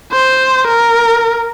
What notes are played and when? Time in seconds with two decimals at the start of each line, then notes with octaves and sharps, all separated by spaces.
0.12 C5
0.67 A#4